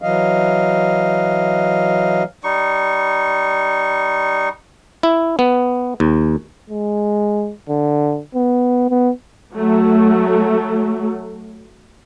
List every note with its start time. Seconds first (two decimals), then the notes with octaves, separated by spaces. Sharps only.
0.02 E3 F#3 D#5 F5
2.44 G3 D#4 C#6
5.03 E4
5.39 B3
6.00 D#2
6.70 G#3
7.69 D3
8.35 B3
8.90 B3
9.54 F#3 A3